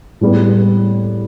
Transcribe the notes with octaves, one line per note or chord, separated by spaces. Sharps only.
A2 G3 B3